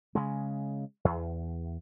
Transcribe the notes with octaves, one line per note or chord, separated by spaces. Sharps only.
C#3 G#3
E2